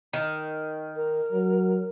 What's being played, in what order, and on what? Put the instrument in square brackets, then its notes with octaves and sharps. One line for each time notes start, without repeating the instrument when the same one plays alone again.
[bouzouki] D#3
[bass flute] A#4
[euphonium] F#3